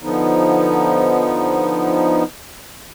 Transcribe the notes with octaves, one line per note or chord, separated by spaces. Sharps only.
D3 F3 B3 D#4